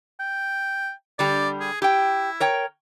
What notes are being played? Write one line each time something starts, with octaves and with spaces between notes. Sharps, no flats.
G5
D3 G3 G4 D5
G#4
E4 G4 G5
A#4 C#5 G5